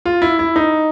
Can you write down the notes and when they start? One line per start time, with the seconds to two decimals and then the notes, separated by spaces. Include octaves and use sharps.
0.06 F4
0.22 E4
0.39 E4
0.56 D#4